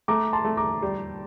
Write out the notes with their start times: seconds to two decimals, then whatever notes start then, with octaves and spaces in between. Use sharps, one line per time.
0.08 A3 A#5 D6
0.33 A5 C6
0.45 A3
0.57 A#5 D6
0.82 G3